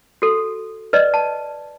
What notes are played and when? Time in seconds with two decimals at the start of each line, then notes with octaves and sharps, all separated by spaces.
0.22 F#4 A4
0.93 B4 D5 D#5
1.14 A5